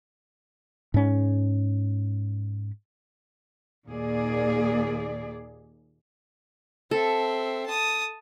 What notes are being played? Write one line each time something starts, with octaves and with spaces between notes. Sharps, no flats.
G#2 C#4
D#2 A#2 A#3 G#4 D5
C4 A4 E5
A5 D#6